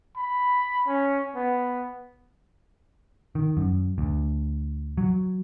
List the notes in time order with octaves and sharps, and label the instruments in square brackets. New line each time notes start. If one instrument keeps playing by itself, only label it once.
[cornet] B5
C#4
B3
[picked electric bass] D#3
F#2
D2
F#3